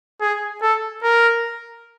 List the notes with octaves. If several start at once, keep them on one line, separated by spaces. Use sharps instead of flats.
G#4
A4
A#4